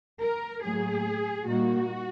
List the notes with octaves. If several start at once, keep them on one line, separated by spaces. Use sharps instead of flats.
A#4
A2 F#3 A#3 G#4
A#2 G3 A#3 D#4 F#4